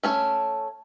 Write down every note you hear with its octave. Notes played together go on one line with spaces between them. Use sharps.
A3 C#4 C#5